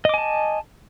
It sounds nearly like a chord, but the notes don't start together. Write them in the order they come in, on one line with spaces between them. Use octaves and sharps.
D#5 D6 G#5 A5